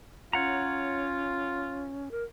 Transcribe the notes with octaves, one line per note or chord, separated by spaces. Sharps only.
C#4 F4 C#5 F#5 A#5
A#4